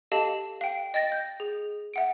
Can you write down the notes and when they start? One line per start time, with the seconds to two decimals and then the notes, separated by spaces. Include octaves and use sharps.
0.12 G4 A4 D#5 F5 A5
0.61 F5 G5
0.94 D#5 G5 A6 A#6
1.12 G6
1.40 G#4
1.94 E5 F#5 D7